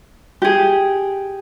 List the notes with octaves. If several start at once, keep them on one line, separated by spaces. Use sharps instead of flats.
G4 G#4